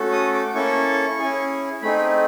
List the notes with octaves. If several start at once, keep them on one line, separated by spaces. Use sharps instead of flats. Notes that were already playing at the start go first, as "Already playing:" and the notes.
Already playing: A3 C#4 F#4 A4
D#6
D6
A#3 C#4 E4 A4 C#6
C#4 E4 G#4
A3 C4 D#4 G#4 B5